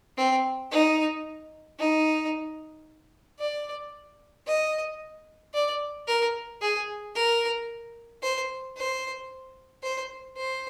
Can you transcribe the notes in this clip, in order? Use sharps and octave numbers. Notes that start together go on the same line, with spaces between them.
C4
D#4
D#4
D5
D#5
D5
A#4
G#4
A#4
C5
C5
C5
C5